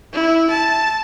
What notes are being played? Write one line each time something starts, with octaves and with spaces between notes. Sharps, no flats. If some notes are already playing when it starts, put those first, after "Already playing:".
E4
A5